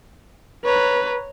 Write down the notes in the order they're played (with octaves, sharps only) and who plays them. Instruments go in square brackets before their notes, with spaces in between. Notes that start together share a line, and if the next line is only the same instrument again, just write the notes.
[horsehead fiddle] B4 [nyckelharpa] C#5 A#5